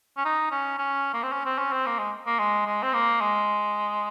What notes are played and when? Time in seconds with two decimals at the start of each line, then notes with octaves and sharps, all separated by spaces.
0.17 C#4
0.25 D#4
0.51 C#4
0.78 C#4
1.14 A#3
1.23 C4
1.32 C#4
1.46 C4
1.58 C#4
1.73 C4
1.87 A#3
1.99 G#3
2.27 A#3
2.39 G#3
2.66 G#3
2.82 C4
2.94 A#3
3.21 G#3